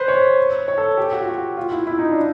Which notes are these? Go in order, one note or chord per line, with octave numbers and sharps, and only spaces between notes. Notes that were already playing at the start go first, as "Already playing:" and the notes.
Already playing: B4 C5
C#5
C#5
A4
G4
F#4
F4
F#4
F4
E4
E4
D#4
D4